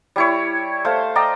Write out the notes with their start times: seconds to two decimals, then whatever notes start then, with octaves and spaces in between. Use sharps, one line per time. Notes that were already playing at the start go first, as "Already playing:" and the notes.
0.16 G3 E4 C#5
0.85 A3 C5 F5
1.15 D5 D#5 G5 A#5